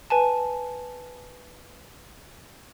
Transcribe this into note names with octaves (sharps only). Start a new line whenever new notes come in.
B4 G#5 A5